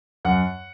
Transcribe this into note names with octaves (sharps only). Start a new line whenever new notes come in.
F#2 F#5